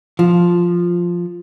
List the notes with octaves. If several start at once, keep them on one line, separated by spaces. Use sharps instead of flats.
F3